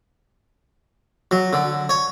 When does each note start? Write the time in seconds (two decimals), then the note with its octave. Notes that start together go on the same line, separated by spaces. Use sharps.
1.31 F#3
1.53 D3
1.89 C#5